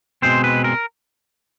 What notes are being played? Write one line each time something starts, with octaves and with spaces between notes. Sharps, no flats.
B2 G#3 C4 C5
B4
A#4